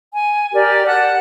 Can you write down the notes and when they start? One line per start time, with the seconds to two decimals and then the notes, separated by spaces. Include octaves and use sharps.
0.13 G#5
0.54 G4 A#4 D5
0.86 F#5 A5 F#6